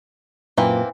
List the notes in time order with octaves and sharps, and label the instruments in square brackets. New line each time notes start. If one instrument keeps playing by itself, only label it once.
[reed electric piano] F#2 A#2 B4 [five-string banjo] E3 A#3 C4